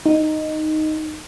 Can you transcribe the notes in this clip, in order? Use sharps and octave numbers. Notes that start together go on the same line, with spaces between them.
D#4